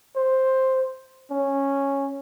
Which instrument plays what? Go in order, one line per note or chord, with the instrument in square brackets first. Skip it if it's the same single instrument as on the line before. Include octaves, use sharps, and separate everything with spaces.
[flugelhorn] C5
C#4